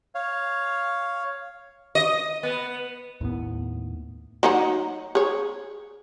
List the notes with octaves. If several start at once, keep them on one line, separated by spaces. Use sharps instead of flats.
C#5 F5
D#5
B3
D#2 A2 B3
F#3 D#4 F#5
G#4 C#5